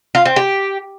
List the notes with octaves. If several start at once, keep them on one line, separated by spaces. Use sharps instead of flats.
F4
C4
G4